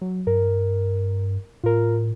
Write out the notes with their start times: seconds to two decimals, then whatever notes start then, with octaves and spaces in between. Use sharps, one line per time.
0.01 F#3
0.27 G2 A#4
1.64 A2 F4 A#4